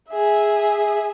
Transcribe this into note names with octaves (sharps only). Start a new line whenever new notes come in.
G#4 E5